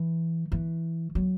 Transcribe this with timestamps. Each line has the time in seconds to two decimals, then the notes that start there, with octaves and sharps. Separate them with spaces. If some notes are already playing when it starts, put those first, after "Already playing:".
Already playing: E3
0.52 E3
1.15 F#3